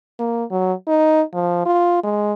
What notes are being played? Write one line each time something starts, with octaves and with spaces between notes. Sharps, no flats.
A#3
F#3
D#4
F3
F4
G#3